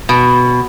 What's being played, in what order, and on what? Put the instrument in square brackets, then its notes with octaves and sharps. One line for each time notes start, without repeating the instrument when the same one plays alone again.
[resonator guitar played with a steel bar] B2